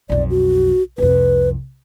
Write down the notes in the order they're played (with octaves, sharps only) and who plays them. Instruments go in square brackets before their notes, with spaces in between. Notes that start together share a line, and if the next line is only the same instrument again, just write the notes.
[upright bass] B1 F2 [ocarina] D5
[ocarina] F#4
[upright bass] C2 F2 [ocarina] B4